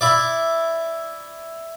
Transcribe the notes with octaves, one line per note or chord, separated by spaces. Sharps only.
E4 D5